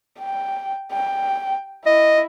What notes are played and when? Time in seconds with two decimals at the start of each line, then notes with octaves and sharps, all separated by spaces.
0.19 G5
0.93 G5
1.86 E4 D#5